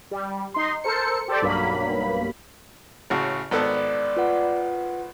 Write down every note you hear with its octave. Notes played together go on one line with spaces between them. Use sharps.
G3
D#4 C6
A4 A#4 C5 C#7
G4 A4 C5 D5
B1 G2 F#3 A#3 B5
A1 C#3 F#4
G#1 B3 A4 D5
F4 B4 F#5